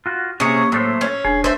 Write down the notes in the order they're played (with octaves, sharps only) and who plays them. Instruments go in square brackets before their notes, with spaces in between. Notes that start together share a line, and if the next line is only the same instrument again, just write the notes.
[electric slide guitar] F4 F#4
[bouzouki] C3 G#4 [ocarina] A#3 [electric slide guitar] C#4 C#5
[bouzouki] A2 [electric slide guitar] F#3 A3 C5
[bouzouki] C#4
[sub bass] E1 [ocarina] D4 [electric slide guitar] G#4
[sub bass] F1 [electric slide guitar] A3 [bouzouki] C5 E5